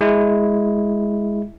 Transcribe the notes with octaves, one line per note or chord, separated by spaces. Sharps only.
G#3 E4